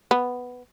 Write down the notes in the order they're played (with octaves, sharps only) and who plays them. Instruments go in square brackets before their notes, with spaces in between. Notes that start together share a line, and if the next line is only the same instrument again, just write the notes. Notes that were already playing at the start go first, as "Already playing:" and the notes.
[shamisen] B3